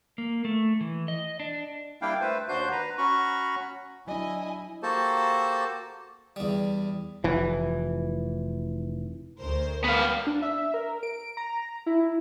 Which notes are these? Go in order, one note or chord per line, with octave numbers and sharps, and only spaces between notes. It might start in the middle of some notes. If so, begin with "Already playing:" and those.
A#3
A3
E3
D#5
D4
G3 A#3 D4 E4 F5 G5
A3 B4 C5
D#2 D4 F#4 C5 C6 G6
B4 A#5
C#4 F#4 A#5 B5 C#6
F#3 D4 E4 D#5 G#5
A#3 F#4 G4 A4 C5 A5
E2 G3
F1 E3
D2 A#4 C5
G3 A#3 B3 F5
D4
E5
A#4
D7
A#5
E4